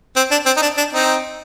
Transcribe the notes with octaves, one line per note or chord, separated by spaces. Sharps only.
C4
D4
C4
D#4
D4
D4
C4 D#4